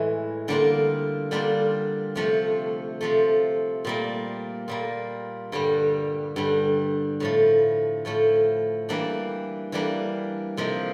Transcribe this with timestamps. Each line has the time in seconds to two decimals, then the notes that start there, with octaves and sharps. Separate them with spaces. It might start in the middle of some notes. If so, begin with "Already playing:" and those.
Already playing: A2 E3 G#3
0.48 D3 G3 A#3 D4 F4
1.31 D3 G3 A#3 D4 F4
2.16 C3 F3 A3
3.01 C3 F3 A3
3.85 A#2 G3 A#3
4.68 A#2 G3 A#3
5.52 G2 D3 G3
6.36 G2 D3 G3
7.20 A2 F3 A3
8.05 A2 F3 A3
8.89 E3 G3 A#3 D4
9.72 E3 G3 A#3 D4
10.57 C3 F3 A#3 D#4